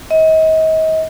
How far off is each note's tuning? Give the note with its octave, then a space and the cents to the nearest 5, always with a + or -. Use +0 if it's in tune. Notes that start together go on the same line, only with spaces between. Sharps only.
D#5 +35